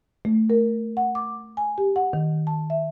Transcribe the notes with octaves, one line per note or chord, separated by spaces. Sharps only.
A3
A#4
F#5
D6
G#5
G4
F#5
D#3
A5
E5